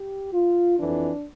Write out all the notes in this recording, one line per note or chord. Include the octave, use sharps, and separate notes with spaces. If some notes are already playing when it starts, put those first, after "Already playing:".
Already playing: G4
F4
F2 E3 D4